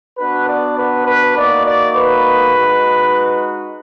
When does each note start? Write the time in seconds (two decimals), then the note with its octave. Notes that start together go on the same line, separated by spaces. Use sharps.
0.18 B3 D4 F#4 B4
0.48 D5
0.78 B4
1.06 B4
1.36 A#3 D#4 F#4 D5
1.66 D5
1.96 B4
2.54 G#3 D#4 F#4